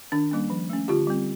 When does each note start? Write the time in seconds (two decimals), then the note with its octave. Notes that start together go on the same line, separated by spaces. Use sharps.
0.12 D#3 D4
0.31 G3 A#3 C#4
0.50 F3
0.70 A3 C#4
0.88 D3 F4 G4
1.07 G3 C4